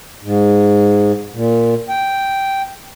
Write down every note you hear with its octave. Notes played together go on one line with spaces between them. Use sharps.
G#2
A#2
G5